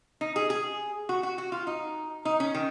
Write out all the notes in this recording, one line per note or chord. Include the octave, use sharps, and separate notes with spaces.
D#4
G#4
G#4
F#4
F#4
F#4
F4
D#4
D#4
C#4
D#3